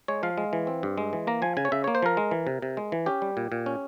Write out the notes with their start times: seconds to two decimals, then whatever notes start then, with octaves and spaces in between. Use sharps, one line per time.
0.08 G#3 C#5
0.23 F3 F5
0.38 G#3
0.53 E3
0.67 C4
0.83 G2
0.98 G#3
1.13 E3
1.27 A#3 A#5
1.42 F3 G#5
1.57 C#3 G#5
1.65 C#5
1.72 C#3 E5
1.84 A#3 C#5
1.95 C5
2.02 F3 A#4
2.17 G#3
2.31 E3
2.47 C3
2.62 C3
2.77 G#3
2.92 E3
3.06 C#4 G4
3.22 G3
3.37 A#2
3.52 A#2
3.66 C#4